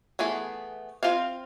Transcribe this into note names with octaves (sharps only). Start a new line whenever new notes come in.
E3 A3 B3 G#4
C4 D#4 F4 C5 F5